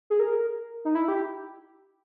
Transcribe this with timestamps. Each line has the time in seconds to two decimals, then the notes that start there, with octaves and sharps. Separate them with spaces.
0.10 G#4
0.20 A#4
0.85 D#4
0.95 E4
1.08 G4